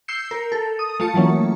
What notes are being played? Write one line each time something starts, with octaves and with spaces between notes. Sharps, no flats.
E6 G6 C7 C#7
A#4
A4
D#6
A3 F4 A5 C#7
E3 F#3 A#3 C#4